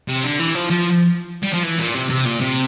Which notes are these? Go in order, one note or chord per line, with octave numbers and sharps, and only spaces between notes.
C3
D3
E3
F3
F3
G3
F3
E3
A#2
C3
C3
A#2
C3